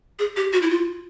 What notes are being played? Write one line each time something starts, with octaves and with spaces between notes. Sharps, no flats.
G#4
G4
F#4
E4
F4